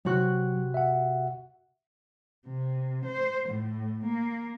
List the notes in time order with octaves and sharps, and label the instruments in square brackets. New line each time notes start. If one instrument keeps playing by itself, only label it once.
[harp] C3 F#4 F#6 [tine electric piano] F#3
[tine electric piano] E5 F#5
[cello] C3
C5
A2
A#3